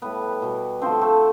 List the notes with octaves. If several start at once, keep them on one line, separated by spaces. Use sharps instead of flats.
A2 G3 B3 B4
B2 G3
D3 F3 A3 C4 C5
A3 A4